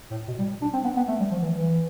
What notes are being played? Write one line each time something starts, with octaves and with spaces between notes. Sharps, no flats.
A2
B2
G3
D4
C4
B3
B3
A3
G3
F3
E3
E3